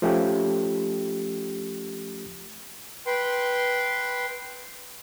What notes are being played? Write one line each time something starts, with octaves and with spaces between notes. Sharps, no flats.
F3 A3 C#4 G4
B4 G5 C6